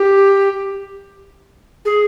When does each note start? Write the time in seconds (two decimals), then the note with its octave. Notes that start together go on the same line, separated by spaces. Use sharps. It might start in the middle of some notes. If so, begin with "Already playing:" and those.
Already playing: G4
1.85 G#4